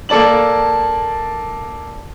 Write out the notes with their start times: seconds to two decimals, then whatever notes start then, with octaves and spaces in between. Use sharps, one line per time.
0.09 A#3 A4 D5 A5 F#7